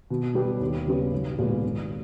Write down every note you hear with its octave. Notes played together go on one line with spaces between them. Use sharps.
B2
G3 B3 G4
D#2
C#3 G3 B3 G4
B1
A#2 G#3 B3
G#1